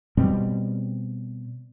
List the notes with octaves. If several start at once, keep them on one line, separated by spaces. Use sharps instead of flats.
B2 G3 C4